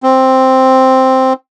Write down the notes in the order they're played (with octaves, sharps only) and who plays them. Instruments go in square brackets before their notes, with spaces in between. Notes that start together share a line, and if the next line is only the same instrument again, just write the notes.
[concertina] C4